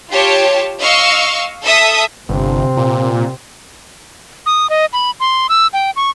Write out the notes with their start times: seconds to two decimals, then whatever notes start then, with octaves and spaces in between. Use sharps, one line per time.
0.11 F4 G4 C#5 A5
0.80 D#5 F5 C#6 E6
1.63 A4 E5 D#6
2.29 G1 C3 C4
2.77 A#2
4.46 D#6
4.70 D#5
4.93 B5
5.20 C6
5.49 E6
5.73 G5
5.96 C#6